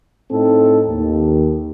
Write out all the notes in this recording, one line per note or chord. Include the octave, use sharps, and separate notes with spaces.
A2 C4 D#4 A4
D#2